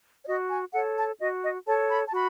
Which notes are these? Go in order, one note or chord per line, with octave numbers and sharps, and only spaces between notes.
C#5
F#4 D#5
G#5
A4 C#5 F#5
A5
F#4 D#5
D#5
A4 C#5 A5
B5
A5
F#4 B5